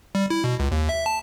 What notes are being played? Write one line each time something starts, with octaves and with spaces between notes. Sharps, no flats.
G3
E4
B2
C#2
D#2
E5
A5